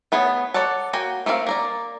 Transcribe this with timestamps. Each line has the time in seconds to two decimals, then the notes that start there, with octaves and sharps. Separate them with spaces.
0.12 A3 B3 G#4 C#5
0.54 A4 C#5 D5 F#5 A5
0.93 A#3 F#4 G5 G#5
1.26 A3 A#3 C4 C#5 F5
1.47 A#3 A#4 D5